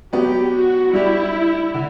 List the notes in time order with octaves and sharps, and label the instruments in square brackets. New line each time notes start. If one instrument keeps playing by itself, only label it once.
[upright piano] F#3 B3 F#4 [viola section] G4
[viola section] F#4
[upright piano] G3 D4 G4 [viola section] E4
[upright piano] D3